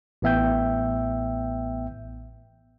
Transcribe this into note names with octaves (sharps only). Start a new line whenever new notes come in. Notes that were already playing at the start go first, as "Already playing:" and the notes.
A1 A2 B3 E5 G5 G6